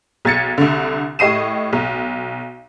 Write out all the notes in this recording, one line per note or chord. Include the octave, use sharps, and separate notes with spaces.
B1 G#6 A6 C#7
C2 D3
A2 G4 D#5 C7 D#7 E7
B1